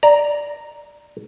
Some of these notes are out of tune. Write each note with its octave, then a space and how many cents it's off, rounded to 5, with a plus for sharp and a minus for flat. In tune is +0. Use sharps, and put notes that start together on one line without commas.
D5 +0 A#5 +0